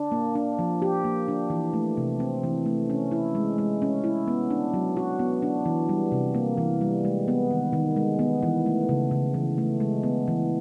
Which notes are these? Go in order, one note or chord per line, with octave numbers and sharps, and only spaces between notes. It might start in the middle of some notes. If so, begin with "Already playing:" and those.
Already playing: D4
A#3
D4
F3
G4
A#3
D4
E3
A3
C3
C4
E3
A3
C#4
E4
G#3
G#3
C#4
E4
B3
D4
F#3
F#4
B3
D4
E3
G3
C3
A#3
E3
G3
G#3
B3
D#3
D#3
G#3
B3
E3
A3
C#3
C#3
E3
A3
G#3
B3
E3